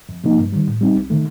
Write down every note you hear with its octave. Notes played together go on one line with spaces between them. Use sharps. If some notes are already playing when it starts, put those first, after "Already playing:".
F2
C3 F3 A#3 D#4
G2
D#3 G3
A2
G3 C4 D#4
C2
C3 D#3 A3